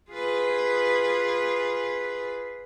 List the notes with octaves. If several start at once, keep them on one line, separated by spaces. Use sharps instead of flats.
F4 G#4 B4